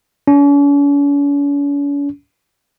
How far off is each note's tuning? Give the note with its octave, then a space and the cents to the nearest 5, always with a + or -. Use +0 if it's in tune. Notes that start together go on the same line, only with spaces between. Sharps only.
C#4 +45